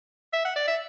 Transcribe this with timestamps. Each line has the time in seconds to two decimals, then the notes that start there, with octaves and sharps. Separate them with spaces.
0.33 E5
0.45 F#5
0.56 D5
0.68 E5